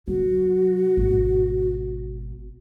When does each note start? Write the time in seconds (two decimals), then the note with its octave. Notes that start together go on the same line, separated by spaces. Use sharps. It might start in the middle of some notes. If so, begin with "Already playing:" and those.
0.08 C3 F#3 F#4
0.97 G#1 B2